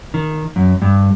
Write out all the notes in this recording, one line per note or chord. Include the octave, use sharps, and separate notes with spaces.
D#3
F#2
G2